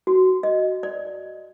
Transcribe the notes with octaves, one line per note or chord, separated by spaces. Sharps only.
F#4
D#5
D5